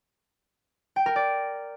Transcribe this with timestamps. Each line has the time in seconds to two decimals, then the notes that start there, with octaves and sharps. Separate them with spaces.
0.96 G5
1.06 A#4
1.16 D5